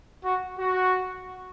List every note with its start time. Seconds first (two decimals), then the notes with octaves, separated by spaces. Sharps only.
0.24 F#4
0.58 F#4